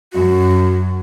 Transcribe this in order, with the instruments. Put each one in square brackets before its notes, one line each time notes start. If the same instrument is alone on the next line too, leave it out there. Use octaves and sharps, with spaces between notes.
[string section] F#2 [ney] F#4